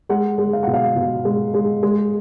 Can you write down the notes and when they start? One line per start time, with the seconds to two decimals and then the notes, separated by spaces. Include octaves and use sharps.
0.09 G#3 F#5
0.38 G#3
0.53 F5
0.63 B2 F#5
0.74 F5
0.96 B2
1.25 G#3
1.54 G#3
1.83 G#3